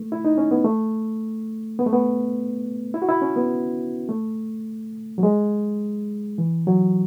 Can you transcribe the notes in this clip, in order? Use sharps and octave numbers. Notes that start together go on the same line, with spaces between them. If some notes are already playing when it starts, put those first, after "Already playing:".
Already playing: A3
E4
D#4
C#4
B3
A3
B3
A3
B3
E4
F#4
E4
C#4
B3
A3
F#3
G#3
E3
F#3